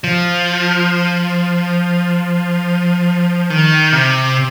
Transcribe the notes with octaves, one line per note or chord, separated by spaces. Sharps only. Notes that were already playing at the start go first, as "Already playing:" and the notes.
F3
D#3
C3